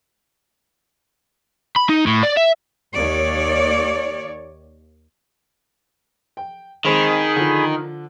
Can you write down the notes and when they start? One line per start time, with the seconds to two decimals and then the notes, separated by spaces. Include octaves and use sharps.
1.76 B5
1.89 D#4
2.07 A2
2.23 D5
2.37 E5
2.94 D#2 C#5 D5
6.37 G5
6.85 D#3 G#3 C4 G#4 B5 C6
7.36 D3 F3